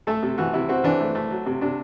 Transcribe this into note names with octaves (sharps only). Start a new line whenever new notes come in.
A3 A4
C3
E3 F#4
C3 E4
C4 F#4
E3 D4
A3
A3
F#3
C3
C3 D4